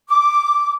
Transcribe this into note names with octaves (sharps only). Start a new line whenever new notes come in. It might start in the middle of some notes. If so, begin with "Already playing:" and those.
D6